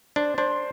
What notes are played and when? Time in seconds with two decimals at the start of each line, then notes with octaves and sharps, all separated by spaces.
0.16 D4 C5
0.38 D4 C5